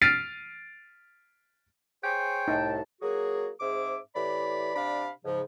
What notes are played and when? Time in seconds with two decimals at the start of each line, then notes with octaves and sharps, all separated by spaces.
0.01 F6 A6 B6 C7 D7 D#7
2.04 G#4 C5 C#5 G5
2.48 C2 A2 D#4 A5
3.02 F#3 A#3 F#4 G#4
3.60 G#2 C4 G#4 E5 D6
4.15 A2 E3 G4 D5 B5
4.74 C3 D4 D5 F5 B5
5.25 G#2 C#3 F3